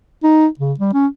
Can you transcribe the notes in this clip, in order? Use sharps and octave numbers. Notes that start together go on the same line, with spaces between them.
D#4
C#3
G3
C#4